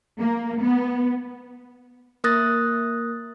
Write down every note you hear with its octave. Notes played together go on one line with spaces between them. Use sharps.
A#3
B3
A#3 A#4 D#6 F#6 A6 A#6